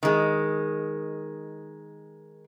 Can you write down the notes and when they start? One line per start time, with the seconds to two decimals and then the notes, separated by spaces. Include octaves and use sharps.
0.03 D#3 G#3